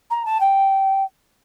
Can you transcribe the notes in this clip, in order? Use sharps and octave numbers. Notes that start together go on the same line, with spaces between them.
A#5
A5
G5